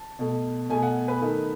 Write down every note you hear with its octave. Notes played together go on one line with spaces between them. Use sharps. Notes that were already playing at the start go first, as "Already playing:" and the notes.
Already playing: A5
B2 A3
B2 A3 G#5
F#5
B4
D#3 A3